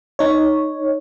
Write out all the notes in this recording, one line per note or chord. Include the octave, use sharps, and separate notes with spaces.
D#4 C#5